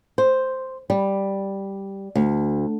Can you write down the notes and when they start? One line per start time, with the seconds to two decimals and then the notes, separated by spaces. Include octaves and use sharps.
0.18 C5
0.90 G3
2.15 D2